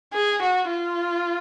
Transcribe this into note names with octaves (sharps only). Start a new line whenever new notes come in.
G#4
F#4
F4